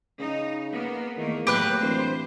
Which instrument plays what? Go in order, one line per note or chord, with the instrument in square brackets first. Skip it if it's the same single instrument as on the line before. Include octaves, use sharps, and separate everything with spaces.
[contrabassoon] C#3 [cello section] D#4
[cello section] A#3 B3
[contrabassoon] E2 [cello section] D#3 A3 A#3
[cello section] A2 F#3 A#3 [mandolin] G4 B4 F#6
[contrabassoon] D1 [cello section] E3 C5